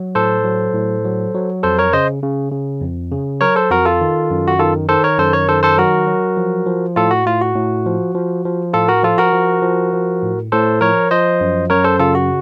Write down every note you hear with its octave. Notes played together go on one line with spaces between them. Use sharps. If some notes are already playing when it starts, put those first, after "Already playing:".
Already playing: F#3
A2 A4 C5
F#3
A2
F#3
F#3
F2 A4 C5
A#4 C#5
C#3 C5 D#5
C#3
C#3
F2
C#3
F#3 A#4 C#5
A4 C5
F2 F#4 A#4
F4 A4
D#3
F#2
F#4
D#3 F4 A4
D#3 A4 C5
A#4 C#5
F#2 A4 C5
A#4 C#5
D#3 A4 C5
A4 C5
F#3 F#4 A#4
F#3
F3
F3
A2 F4 A4
F#4
A2 F4
F#4
A2
F3
F3
F3
A2 F4 A4
F#4 A#4
F3 F4 A4
F#4 A#4
F3
F3
F3
A2
A2 A4 C5
F3 A#4 C#5
F3 C5 D#5
F#2
F#2 A#4 C#5
A4 C5
C#3 F4 A4
F#4